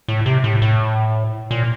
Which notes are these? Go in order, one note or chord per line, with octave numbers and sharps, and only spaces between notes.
A2
C3
A2
A2
A#2